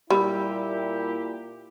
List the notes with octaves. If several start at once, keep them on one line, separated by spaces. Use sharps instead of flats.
A#2 G3 E4 G4 B5 E6